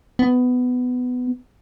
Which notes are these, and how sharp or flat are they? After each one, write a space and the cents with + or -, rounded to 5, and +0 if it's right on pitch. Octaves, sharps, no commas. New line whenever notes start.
B3 +15